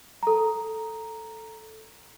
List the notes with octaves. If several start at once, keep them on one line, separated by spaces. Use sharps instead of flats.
A4 A#5